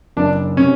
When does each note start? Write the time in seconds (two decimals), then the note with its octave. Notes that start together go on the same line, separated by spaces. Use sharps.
0.17 F#1 D4
0.57 C3 C#4